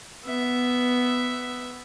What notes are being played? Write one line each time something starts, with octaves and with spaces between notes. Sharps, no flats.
B3 E5